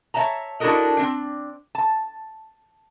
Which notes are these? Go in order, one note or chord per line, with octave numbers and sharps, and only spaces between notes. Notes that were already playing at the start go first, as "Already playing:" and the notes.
C#5 D#5 E5 A5 A#5
D4 E4 F#4 A4 A#4 D#5
C4 D4
A5